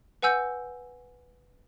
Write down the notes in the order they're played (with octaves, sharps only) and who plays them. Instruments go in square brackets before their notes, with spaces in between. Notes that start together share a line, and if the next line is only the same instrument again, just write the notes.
[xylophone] B4 F#5 G#5 E6 G6